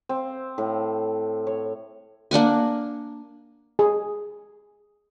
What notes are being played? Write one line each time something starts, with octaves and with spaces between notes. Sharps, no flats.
C4
A2
C#5
A#3 D4 F#5 G#5
G#4